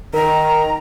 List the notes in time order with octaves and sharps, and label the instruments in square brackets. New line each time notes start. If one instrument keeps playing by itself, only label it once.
[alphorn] D#3 [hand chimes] A#4 [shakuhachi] A#5